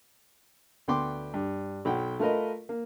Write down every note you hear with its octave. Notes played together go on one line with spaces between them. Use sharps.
D2 B3 G5 C6 D6
G2
B1 F#3 F#5 G5
A3 F4 A#4 B4 D#5
A#3